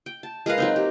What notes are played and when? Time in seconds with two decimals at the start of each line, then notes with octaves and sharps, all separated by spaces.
0.06 G5
0.23 A5
0.46 G#3 A#4 B4 F5
0.58 F#3 C4 D#4
0.76 G4